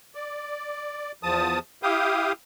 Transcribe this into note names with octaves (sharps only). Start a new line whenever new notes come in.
D5
E2 F3 A5 D#6
E4 G4 F5 G5 D#6